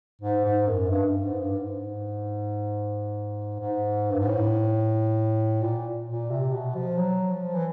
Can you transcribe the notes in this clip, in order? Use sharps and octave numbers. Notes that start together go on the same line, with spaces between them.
G#2
G#2
F#2
G2
G2
G#2
G2
G#2
G#2
G2
G#2
A2
A#2
A#2
C3
B2
F3
F#3
F3
E3